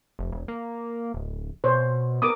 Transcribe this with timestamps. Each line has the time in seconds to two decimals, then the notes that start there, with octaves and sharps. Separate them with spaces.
0.19 F1
0.32 E1
0.48 A#3
1.14 D1
1.64 B2 C5 C#5
2.22 B3 A#4 D6 D#6